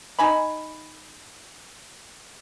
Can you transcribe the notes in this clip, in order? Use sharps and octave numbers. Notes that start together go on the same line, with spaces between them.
D#4 G#5 B5